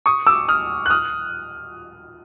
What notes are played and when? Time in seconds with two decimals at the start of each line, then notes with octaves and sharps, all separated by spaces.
0.06 C#6 D#6
0.27 D6 E6
0.48 D#6 F6
0.86 F#6
0.90 D#6 F6